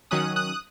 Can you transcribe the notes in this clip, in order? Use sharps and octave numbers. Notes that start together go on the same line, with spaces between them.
D#3 F#3 C#4 D#6 F#6
D#6 F#6